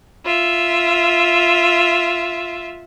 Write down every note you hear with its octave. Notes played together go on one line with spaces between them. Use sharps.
F4 E5